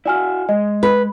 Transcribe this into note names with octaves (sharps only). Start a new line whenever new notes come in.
E4 F#4 D5 G#5 F6
G#3 D#5
B4